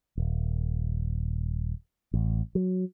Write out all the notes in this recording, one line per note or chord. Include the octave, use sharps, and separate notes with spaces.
D#1
A1
F#3